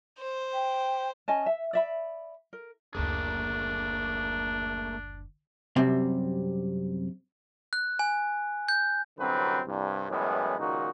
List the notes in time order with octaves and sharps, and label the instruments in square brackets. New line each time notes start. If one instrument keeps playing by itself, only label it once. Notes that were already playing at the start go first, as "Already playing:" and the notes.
[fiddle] C5
[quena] G5
[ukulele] C#4 D#5 G#5 A5
E5
D5 E5 B5
A#4
[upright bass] F#1 D2 [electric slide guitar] A3 A#3 G#4 [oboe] D4
[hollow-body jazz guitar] F#2 C3 G3 C4
[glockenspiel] F#6
G#5
G6
[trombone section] C2 F#2 D3 F#3 C4 B4
C2 G2
F#2 A2 E3 G3 G#3 B3
C#2 A#2 D#3 D#4 F#4